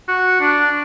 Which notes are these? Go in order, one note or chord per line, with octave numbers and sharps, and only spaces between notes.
F#4
D4